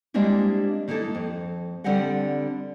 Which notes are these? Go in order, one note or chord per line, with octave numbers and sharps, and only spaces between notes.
G3 G#3 A#3 C4 D4 E4
D#3 A#3 D#4 E4 A4
F2
D3 G3 C4 G4 D#5 F#5